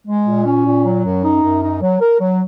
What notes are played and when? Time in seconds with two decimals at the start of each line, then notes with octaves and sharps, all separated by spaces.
0.07 G#3
0.26 A#2
0.46 C#4
0.65 A#2
0.85 F#3
1.05 F#2
1.23 D#4
1.43 F#2
1.62 D#4
1.82 F#3
2.01 A#4
2.20 F#3